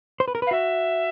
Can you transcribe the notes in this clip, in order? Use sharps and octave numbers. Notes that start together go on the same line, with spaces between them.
C5
B4
A#4
B4 F5
F#4 E5